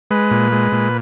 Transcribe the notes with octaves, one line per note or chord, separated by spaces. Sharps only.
G#3 B4
A#2
G#3
A#2